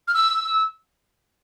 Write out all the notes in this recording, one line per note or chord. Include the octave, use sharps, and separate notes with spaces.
F6
E6